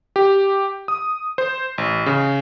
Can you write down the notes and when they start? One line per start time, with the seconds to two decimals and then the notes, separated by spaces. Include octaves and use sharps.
0.16 G4
0.88 D#6
1.38 C5
1.78 A1
2.06 C#3